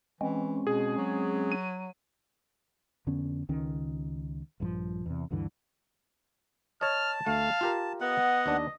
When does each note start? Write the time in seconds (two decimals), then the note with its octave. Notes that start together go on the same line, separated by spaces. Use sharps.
0.21 E3 G#3 C4 C#4
0.67 B2 G#4
0.97 F#3
1.52 D#7
3.07 F2 D3 B3 C#4
3.49 C#2 D#3 C#4
4.60 A#1 G2 C#3 F3
5.06 E2 C3
5.31 D2 G2 D3 E3
6.81 C#5 D#5 A5 F6
7.26 D2 A3 F5
7.61 F4 G4 A#4
8.01 B3 D#5 F#5
8.46 D#2 D4